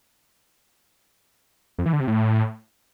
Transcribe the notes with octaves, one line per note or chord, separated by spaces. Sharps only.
F2
E3
D3
C3
A2